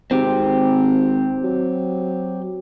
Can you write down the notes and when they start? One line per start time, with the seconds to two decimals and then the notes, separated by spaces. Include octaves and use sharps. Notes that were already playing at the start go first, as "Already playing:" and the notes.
0.11 G#1 C4 G4
1.43 F#3